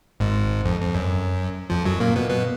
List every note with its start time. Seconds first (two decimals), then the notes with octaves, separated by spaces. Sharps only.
0.20 G#1 G#2
0.65 F2
0.81 F2
0.95 F#2
1.70 F2 F3
1.85 F#2 F#3
2.00 A#2 A#3
2.16 B2 B3
2.30 B2 B3